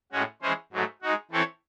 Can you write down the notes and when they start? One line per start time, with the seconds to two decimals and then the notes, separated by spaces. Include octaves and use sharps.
0.12 A2 G#3 C#4 F#4
0.42 E3 G#3 C#4 G#4 C5
0.72 G#2 F#3 A3
1.02 G#3 D#4 F#4
1.31 E3 C4 E4 A4 C#5